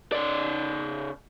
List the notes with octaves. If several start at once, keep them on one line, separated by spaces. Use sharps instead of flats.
C#3 D5